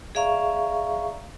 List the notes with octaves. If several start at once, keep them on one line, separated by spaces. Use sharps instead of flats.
G#4 D5 E5 F5 A#5 C#6